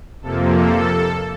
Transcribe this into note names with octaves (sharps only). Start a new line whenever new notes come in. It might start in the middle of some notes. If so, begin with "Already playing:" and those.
F2 C3 F3 A#3 A4
A4